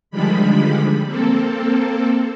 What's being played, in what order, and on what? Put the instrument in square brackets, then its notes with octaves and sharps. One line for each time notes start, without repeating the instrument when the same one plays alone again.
[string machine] D3 D#3 F3 G3 G#3 B5
A#3 C4 A4